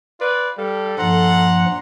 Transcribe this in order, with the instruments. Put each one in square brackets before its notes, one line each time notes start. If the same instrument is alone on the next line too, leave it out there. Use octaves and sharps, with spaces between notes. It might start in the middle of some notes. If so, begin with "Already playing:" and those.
[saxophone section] F4 B4 [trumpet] D5
[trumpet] G3 [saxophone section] A4 [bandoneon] F5
[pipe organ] G2 F3 [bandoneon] A#2 A#5 C6 [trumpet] F#5